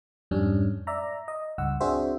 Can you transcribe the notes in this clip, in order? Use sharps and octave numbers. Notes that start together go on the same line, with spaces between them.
F2 G#2 G3 C#4 D4
D5 E5 A#5
D#5
C#2 G2 F#5 E6
C4 D4 F#4 G#4 C5 E5